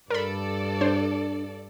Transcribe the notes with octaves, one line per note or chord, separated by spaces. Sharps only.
G2 A4 A#4 D5 B5
D4 C5